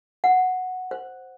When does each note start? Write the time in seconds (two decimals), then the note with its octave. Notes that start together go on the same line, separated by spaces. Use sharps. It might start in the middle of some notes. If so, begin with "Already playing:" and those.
0.24 F#5
0.91 C5